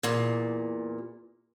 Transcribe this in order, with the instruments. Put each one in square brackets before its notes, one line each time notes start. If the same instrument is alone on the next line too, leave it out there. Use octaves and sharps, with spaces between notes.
[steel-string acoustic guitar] E2 A#2